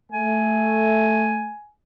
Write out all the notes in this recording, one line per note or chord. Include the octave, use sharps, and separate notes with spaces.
A3 G#5